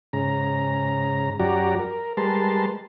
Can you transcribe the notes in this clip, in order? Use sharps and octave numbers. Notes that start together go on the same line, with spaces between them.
G#2 C#3 A#5
F#2 F#3 F#4 G4 D5 A#5
A#4
G3 G#3 A#4 B4 A5 C6